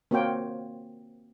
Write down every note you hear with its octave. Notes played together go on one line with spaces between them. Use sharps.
A#3 C4 F#4 C5 C#5 G5